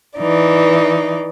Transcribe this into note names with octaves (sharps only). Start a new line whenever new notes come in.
E3 D#4 D5